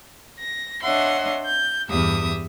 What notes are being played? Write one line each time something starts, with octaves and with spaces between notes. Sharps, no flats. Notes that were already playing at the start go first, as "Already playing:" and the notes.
A#6
D4 C#5 D#5 E5 F#5 C6
G6
E2 G2 G4 E5 D#6